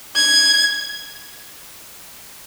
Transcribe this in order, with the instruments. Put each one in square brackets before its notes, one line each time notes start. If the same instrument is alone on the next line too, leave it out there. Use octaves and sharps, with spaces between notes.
[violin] G#6